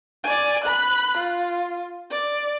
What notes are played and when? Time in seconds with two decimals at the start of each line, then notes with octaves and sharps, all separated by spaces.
0.24 D5 G#5
0.64 B5 F#6
1.18 F4
2.11 D5